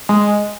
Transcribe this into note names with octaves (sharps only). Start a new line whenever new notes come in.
G#3